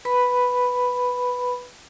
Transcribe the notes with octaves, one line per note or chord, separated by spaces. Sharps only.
B4 B5